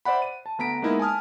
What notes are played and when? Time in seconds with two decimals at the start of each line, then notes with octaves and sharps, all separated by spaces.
0.05 C5 D5 E5 F#5 B5
0.22 D#7
0.46 A5
0.58 D2 B3 A#5 B6 D7
0.82 G#3 A#3 B3 D#4 E4 A#4
0.99 G#5 A5 D#6 F6